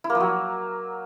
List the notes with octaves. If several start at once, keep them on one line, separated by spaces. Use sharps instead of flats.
E4
A#3
F3
F#3